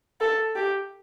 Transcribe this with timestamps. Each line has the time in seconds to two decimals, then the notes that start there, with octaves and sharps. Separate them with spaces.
0.21 A4
0.56 G4